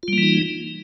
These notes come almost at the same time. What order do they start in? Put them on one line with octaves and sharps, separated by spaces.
F4 G3 A#3 E3 D#4